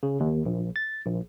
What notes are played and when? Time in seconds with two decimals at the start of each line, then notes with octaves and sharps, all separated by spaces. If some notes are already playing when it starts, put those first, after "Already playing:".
0.03 C#3
0.20 D#2
0.45 A#1
0.76 A6
1.06 A#1